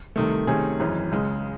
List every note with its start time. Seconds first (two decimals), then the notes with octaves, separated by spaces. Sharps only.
0.16 C2 C3 D#3 A3
0.47 C3 D#3 A3 C#4 G#4
0.79 G#1 F#2 E3 G#3 C#4
1.11 C#2 C#3 G#3